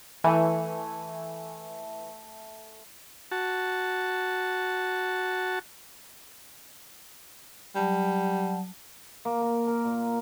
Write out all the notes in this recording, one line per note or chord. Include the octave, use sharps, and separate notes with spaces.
E3 A3 G#5
F#4 A5
F#3 G3 F#5 A5
A#3
A#4
A#4
A#2